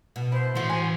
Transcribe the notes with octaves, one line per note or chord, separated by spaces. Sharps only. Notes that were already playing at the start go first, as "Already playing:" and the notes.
B2
E4 C5
A2 E3 F#4 C6
G#5